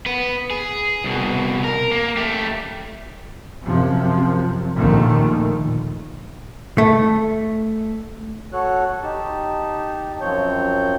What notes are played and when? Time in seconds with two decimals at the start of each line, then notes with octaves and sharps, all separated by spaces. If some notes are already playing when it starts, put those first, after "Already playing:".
0.06 B3 B4
0.50 G#4
1.04 C2 B2
1.64 A#4
1.92 A#3
2.17 A3 G4
3.65 F#2 C3 F3
4.75 A#1 D#2 A#2 D3 D#3 A3
6.78 A3
8.53 F#4 A4 C#5 F#6
9.03 D#4 G4 A5
10.21 F#2 F3 C4 C#5 G6